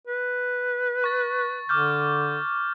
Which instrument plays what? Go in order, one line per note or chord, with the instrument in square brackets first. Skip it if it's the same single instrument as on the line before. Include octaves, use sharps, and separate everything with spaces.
[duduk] B4
[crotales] C#6 A6
[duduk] D3 [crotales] D6 F6 G6